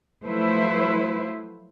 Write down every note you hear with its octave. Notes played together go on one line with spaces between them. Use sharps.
F3 F#3 A3 E4 B4 C5